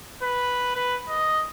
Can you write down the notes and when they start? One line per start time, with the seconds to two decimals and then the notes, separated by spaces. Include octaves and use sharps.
0.23 B4
0.75 B4
1.09 D#5